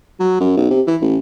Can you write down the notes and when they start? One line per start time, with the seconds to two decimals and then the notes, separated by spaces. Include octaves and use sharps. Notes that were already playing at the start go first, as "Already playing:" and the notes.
0.20 F#3
0.40 F#2
0.57 B1
0.70 C3
0.87 E3
1.01 A1